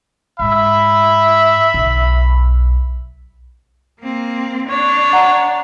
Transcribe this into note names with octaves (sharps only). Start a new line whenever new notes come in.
G#2 E5 B5
B1
A#3 C4
D4 C#5
F#5 A#5